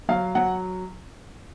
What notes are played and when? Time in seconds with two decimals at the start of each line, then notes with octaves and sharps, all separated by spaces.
0.09 F#3 F5
0.35 F#3 F#5